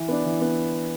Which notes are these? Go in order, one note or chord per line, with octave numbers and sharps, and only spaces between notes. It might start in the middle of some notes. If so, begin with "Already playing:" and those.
Already playing: E3
B3 D4
E3
B3 D4